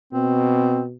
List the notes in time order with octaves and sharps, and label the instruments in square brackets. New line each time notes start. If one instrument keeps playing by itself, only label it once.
[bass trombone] B2 [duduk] C4